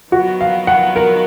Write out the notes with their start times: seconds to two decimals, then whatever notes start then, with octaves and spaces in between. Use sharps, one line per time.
0.12 D#3 F#3 B3 F#4
0.41 F5
0.67 F#5
0.96 A#4